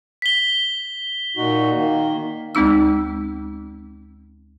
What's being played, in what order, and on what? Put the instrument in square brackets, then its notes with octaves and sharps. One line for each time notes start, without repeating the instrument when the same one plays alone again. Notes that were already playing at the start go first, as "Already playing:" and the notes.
[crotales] B6 G7
[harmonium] A#2 D#4 F#4
D#3 A#3
[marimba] D2 G#3 C4 D#4 E6